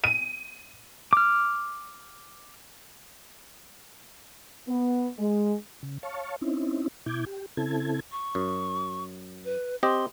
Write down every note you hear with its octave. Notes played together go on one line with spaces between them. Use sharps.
D#7
D6 F6
B3
G#3
C#3
C#5 F5 A5 C#6
C4 C#4 D#4 E4
B2 E4 D6 G6 G#6
G4
C#3 C4 E4 A4 A5 G#6
C#6
F#2
B4
C4 G4 D#5 C6